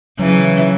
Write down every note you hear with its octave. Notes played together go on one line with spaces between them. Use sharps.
C#3 E3 F#3